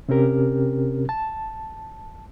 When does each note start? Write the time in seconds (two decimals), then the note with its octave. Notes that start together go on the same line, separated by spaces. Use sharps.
0.09 C3 C4 C#4 G4 A#4
1.09 A5